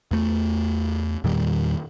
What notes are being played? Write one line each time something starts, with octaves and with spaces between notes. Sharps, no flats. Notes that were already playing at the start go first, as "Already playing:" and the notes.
E2 A3
E2 A#2 D#3 G3